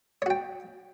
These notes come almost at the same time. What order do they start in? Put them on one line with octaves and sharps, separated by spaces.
C#5 F#4 G5